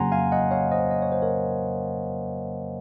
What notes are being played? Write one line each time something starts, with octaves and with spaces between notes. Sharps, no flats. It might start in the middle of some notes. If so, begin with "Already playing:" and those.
Already playing: F2 C#3 F#3 A#3 F#5 G#5 A#5 C6
F5 G#5
D#5 F#5
C#5 F5
C5 D#5
D#5
C#5
C5
A#4 C#5